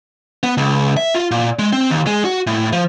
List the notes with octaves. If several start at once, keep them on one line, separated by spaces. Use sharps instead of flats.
B3
C#2
E5
F4
A#2
G#3
C4
D#2
G#3
F#4
A2
F3